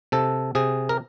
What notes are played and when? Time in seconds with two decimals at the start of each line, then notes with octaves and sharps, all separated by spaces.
0.12 C3 A4
0.55 C3 G#4
0.89 A#4